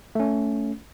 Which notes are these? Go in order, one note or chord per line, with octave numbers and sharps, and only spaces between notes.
A3 C#4